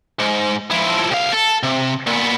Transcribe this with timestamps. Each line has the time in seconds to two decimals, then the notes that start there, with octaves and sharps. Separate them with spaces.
0.19 G#2
0.71 F3 E4
1.11 C2 F5
1.32 A4
1.63 C3
2.07 A#2 B3